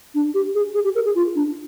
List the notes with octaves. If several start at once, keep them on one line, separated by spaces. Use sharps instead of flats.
D4
G4
G#4
G#4
G4
A#4
G#4
F4
D4